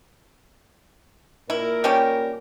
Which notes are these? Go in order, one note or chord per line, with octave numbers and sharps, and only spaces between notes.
A#2 E4 A#4
G3 C#4 G4